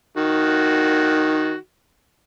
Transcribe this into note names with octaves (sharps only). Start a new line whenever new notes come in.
D#3 F#4